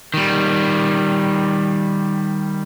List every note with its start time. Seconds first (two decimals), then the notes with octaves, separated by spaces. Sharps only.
0.14 D#3 G3